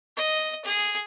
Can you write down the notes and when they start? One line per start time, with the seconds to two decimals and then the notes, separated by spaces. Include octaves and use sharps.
0.17 D#5
0.65 G#4